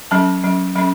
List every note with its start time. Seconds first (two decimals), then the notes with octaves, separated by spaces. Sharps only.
0.11 F#3 C#4 A5
0.43 F#3 C#4
0.75 F#3 C#4 B5